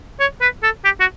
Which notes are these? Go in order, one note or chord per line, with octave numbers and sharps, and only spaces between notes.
C#5
B4
A4
G4
F#4